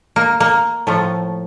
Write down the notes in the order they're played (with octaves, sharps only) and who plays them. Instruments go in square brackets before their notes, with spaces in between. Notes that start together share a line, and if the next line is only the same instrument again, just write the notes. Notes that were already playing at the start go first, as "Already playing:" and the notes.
[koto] A#3
A#3
A2 F3 A3